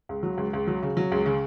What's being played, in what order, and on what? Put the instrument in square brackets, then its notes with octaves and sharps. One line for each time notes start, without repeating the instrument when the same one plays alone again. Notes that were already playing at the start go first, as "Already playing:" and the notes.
[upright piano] C#2
F#3
C#2
C#2
F#3
C#3
F#3
C#2
C#3